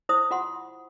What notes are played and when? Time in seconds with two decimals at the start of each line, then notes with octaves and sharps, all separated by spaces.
0.09 E4 C5 D#6
0.31 F4 F#5 C6